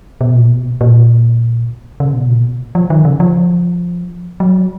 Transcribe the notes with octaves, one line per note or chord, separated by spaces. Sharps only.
B2
A#2
B2
A#2
C#3
B2
A#2
B2
F3
D#3
C#3
F3
F#3